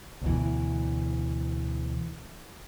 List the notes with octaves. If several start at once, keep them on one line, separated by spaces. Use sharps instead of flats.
D2 B2 E3